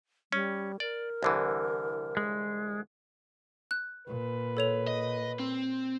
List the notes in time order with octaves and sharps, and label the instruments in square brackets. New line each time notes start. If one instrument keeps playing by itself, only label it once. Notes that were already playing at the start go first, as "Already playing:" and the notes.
[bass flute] G3 [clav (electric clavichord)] C#4
[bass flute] A#4 [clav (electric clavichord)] D5
[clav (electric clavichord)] C2 D3 E3
[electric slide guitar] G#3
[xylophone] F#6
[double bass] A#2 [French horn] B4
[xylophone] A4 C#5 F7
[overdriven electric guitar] D#5
C4